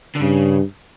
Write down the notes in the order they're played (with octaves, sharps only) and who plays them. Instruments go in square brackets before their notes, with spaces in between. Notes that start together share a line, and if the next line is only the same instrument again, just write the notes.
[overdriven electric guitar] D3
[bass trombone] G2 [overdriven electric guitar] C#3